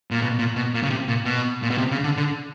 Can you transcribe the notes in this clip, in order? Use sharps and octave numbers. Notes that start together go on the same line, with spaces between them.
A#2
B2
A#2
B2
A#2
C#3
C3
A#2
B2
A#2
B2
C3
C#3
D3
D3